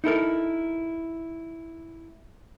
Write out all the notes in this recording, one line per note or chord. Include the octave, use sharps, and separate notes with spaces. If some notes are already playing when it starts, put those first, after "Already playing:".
D#4 E4 A4 A#4